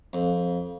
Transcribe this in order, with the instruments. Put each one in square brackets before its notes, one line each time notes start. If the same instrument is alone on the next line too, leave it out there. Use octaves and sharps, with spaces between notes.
[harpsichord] F2